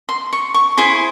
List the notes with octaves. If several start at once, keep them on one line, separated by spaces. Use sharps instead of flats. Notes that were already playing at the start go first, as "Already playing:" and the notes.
C6
C#6
C#6
E4 G#4 C5 C6